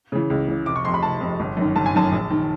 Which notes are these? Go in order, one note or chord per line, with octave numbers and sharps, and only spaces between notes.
C#3 E3
C#2
C#3 E3
F1 D6
C#6
F2 C3 C6
B5
F1 A5
F2 C3
G1
F#2 D#3
G1 A5
G#5
F#2 D#3 A5
A#1
D#3